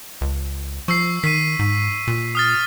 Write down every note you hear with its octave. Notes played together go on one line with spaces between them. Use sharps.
C#2
F3 C#6 E6 C7
D#3 B6 D#7
G#2
A#2
D#6 F6 A6